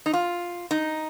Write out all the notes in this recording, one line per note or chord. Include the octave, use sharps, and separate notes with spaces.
D#4
F4
D#4